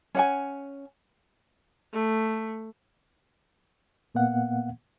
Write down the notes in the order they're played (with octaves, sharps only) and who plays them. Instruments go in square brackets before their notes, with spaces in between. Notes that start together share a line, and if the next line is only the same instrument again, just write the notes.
[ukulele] C#4 F#5 G#5
[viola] A3
[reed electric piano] A#2 A#3 B3 F5 F#5